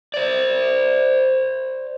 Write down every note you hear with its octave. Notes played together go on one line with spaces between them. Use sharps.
C5 D5